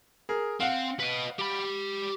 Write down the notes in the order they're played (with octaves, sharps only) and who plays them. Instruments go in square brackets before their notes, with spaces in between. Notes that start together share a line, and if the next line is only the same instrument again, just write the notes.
[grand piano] G#4 A#4
[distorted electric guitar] C4 [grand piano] F5 F#5
[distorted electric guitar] B4 D#5
G4 B5